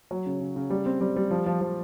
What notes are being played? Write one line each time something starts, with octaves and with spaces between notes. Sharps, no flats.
F#3
C#3
C#3
C#3
G3
C4
G3
G3
F3
F3
F3